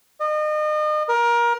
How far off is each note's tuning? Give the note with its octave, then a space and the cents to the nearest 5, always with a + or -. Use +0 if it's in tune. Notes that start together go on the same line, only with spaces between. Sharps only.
D#5 -35
A#4 +25